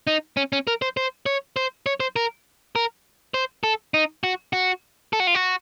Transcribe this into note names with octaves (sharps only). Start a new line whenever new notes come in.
D#4
C#4
C#4
A#4
C5
C5
C#5
C5
C#5
C5
A#4
A#4
C5
A4
D#4
F#4
F#4
A4
F#4
F4
F#4